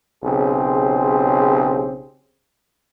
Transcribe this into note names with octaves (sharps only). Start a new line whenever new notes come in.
B1 C#3 C4 G4 G#4